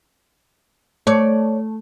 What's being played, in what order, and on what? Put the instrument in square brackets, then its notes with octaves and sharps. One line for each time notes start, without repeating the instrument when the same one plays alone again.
[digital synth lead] A3 [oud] C#5 D5